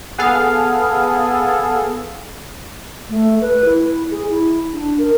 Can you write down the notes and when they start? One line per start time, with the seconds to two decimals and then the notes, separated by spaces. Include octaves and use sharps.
0.18 B3 G#4 A4 F5
3.09 A3
3.41 B4
3.65 E4
4.11 G#4
4.30 E4
4.74 D4
4.99 A#4